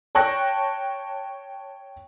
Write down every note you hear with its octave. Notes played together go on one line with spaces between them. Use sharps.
C#5 G5 A5 C#6 F#6 A#6